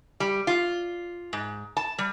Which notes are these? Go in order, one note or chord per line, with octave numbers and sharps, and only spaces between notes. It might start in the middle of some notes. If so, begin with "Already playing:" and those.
G3
F4
G#2
A5
G3